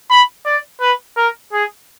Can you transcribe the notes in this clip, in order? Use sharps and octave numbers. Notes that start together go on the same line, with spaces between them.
B5
D5
B4
A#4
G#4